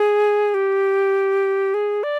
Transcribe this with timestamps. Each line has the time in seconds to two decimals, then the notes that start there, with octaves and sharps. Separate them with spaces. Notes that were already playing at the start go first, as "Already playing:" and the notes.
Already playing: G#4
0.54 G4
1.74 G#4
2.03 D5